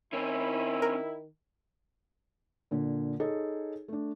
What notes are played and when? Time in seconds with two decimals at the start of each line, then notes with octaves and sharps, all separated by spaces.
0.13 D#3 C4 C#4 E4
0.82 A#4
2.71 A#2 D3
3.20 D#4 G#4 A4 C#5
3.88 A3 D4